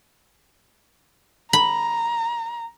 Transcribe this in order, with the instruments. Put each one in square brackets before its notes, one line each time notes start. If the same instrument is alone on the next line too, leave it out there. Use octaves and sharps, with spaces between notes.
[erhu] A#5 [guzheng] B5